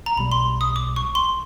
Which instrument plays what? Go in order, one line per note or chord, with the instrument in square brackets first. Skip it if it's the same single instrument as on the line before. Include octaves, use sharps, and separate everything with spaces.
[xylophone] A#5
[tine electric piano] B1 B2 G3 [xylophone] B5
[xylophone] C6
D#6
D6
C#6
C6